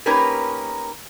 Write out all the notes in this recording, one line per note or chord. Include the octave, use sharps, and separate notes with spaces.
A#3 C#4 D#4 G4 A#4 B4